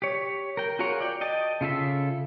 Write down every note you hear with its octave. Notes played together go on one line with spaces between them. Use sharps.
G4 C#5
A#4 G5
F4 F#4 G#4 A#4 C#5
D5 G5
D#5 G5 A5
C#3 F4 A4 E5